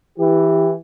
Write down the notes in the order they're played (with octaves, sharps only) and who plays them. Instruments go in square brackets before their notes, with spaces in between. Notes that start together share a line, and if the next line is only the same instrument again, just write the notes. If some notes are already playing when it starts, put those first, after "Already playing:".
[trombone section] E3 G4